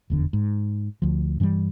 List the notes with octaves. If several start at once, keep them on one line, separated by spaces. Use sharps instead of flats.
F1 E2 D3
G#2
D2 F3
G2 E3 F#3 G3